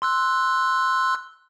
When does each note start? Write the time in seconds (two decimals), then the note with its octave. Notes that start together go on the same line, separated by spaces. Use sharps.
0.02 C6 E6 F#6